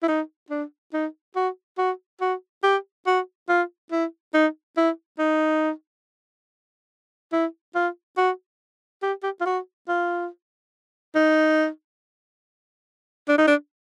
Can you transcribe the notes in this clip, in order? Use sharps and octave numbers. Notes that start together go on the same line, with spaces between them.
E4
D#4
D4
D#4
F#4
F#4
F#4
G4
F#4
F4
E4
D#4
E4
D#4
E4
F4
F#4
G4
G4
F4
F#4
F4
D#4
D4
D#4
D4